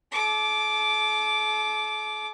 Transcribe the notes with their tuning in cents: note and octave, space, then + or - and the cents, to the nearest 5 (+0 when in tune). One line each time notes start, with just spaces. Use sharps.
A4 -45 D6 +0